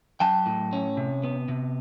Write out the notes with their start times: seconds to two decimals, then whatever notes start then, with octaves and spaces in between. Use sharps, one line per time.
0.20 F#3 G5 A5
0.46 A2
0.73 C#4
0.97 C3
1.23 B3
1.48 C3